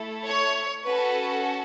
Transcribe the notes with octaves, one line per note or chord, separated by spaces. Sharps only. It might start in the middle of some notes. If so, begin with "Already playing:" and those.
Already playing: A3 E4 A4
C#5
C#4 F#4 A4 B4